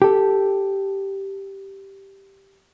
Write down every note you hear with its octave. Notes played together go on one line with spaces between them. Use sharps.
G4 A4